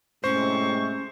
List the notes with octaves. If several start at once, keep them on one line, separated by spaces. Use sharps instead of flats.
A2 C3 G#3 C#4 C5 C#6